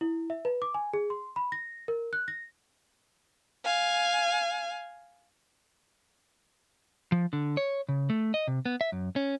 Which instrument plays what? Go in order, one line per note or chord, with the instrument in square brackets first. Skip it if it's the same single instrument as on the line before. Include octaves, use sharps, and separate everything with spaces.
[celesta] E4
E5
B4
D6
G#5
G#4
C6
B5
A#6
A#4
F#6
A#6
[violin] F5 G#5
[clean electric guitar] F3
D3
C#5
C#3
A3
D#5
C3
B3
E5
F#2
C#4